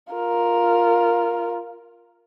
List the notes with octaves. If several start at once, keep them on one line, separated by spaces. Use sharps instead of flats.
F4 A#4